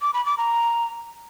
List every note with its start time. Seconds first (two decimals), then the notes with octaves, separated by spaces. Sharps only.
0.02 D6
0.14 B5
0.26 D6
0.38 A#5